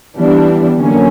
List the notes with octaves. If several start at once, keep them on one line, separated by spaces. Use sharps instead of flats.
E3 G3 B3 D4
D3 F#3 A#3 C#4